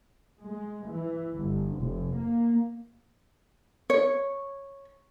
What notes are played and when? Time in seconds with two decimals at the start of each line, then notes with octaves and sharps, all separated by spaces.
0.41 G#3
0.88 E3
1.35 G1
1.77 F1
2.15 A#3
3.90 C#5